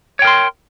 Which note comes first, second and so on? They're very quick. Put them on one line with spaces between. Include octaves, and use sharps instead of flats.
C#5 G5 A#4 C6